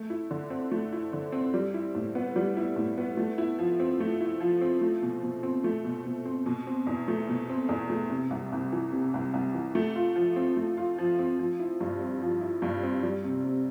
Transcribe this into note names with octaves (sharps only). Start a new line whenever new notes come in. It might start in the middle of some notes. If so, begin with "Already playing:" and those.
Already playing: A3
E4
D3
C4
A3
E4
D3
C4
G3
E4
A2
B3
G3
E4
A2
B3
A3
E4
F3
C4
A3
E4
F3
C4
A3
B2
B2
C4
A3
B2
B2
C4
B2
C4
E2
A3
B2
C4
E2
A3
C3
C2
C2
E3
C3
C2
C2
E3
A3
F4
F3
C4
A3
F4
F3
C4
F3
E4
G2
C4
F3
E4
G2
C4
G3
C3
C3